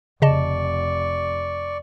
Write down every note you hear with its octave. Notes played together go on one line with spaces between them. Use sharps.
F1 C#3 D5 D#5 A5 C#6